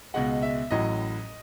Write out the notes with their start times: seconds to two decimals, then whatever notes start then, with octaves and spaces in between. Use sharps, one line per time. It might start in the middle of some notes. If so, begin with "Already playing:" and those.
0.14 C#2 B2 G#3 F#5
0.42 E5
0.71 A1 A2 F#3 D#5